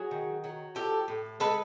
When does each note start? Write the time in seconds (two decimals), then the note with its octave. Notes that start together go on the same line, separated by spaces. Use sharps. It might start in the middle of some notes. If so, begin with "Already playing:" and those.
Already playing: F#3 F#4 G#4
0.11 D#3
0.44 F#3
0.75 F3 G4 A4
1.08 A2
1.40 G#3 A4 B4